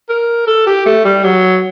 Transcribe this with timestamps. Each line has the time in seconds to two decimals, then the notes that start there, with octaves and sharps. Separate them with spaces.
0.09 A#4
0.47 A4
0.66 G4
0.86 A3
1.05 G3
1.24 F#3